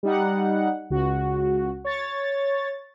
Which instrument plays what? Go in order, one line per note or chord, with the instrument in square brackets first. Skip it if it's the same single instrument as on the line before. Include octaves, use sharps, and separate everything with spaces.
[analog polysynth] G3 D#4 F#5
C#2 F#4
C#5 A6